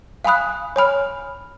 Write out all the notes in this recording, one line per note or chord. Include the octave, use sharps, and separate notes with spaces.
F5 G#5 B5 D#6 F#6
C#5 G#5 B5 F6